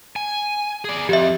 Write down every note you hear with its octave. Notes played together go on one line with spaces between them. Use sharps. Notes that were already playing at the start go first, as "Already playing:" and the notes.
G#5
G#4 D5
F2 G4 E5